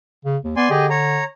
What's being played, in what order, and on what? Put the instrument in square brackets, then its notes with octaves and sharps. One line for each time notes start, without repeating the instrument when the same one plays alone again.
[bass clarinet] C#3
D#2
[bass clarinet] B3 [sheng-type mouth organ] D5 G#5 C6
[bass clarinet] D3 [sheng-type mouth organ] G4 G#4 D#5
[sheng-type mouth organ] C#5 A#5